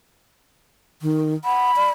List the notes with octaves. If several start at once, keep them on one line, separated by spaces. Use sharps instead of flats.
D#3
F#5 B5
D5